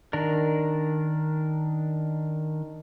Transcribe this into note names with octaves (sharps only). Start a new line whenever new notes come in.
D#3 D4 A#4